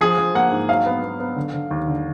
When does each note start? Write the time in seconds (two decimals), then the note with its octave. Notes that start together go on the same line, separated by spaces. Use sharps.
0.01 F3 G#4
0.18 F3
0.35 A#3 F#5
0.52 G#2
0.69 F#3 F5
0.86 B3
1.03 B3
1.20 B3
1.36 D3
1.54 D3
1.71 D#2
1.88 D3